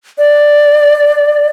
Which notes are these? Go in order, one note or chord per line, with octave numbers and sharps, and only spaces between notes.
D5